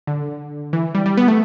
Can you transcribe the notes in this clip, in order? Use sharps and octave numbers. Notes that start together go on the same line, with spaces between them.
D3
E3
G3
G3
B3
A3